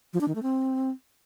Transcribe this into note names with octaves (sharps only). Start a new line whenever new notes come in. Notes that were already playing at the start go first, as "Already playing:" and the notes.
F3
D4
D#3
A3
C4